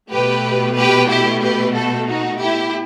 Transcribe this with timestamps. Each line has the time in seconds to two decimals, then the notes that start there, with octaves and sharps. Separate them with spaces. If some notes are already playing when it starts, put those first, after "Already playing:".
0.11 B2 A3 G4 B4
0.76 G4 B4
1.09 E4 G4
1.42 G4 B4
1.75 F#4 A4
2.07 D#4 F#4
2.40 E4 G4